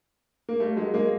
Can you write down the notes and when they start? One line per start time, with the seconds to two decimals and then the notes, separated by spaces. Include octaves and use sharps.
0.49 A#3
0.60 G3 A3
0.77 F#3 G#3
0.94 G#3 A#3